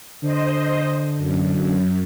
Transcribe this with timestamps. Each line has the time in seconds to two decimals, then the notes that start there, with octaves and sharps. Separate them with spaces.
0.22 D3 C5 D#5
1.16 F#2